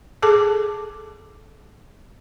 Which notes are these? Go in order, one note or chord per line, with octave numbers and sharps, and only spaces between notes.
G#4 A4 A5 D6